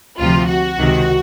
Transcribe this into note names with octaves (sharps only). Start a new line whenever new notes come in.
D2 C3 F3 F4
F#4
C#2 C3 D#3